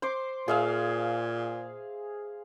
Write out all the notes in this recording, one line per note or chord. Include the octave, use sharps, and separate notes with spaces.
C5 C6 D6
A#2 G#4 E5 F5